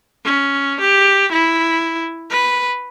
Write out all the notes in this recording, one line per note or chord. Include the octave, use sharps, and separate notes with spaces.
C#4
G4
E4
B4